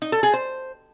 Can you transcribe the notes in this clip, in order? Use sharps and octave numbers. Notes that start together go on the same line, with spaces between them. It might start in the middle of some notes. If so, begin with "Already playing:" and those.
D#4
A4
G#4
C5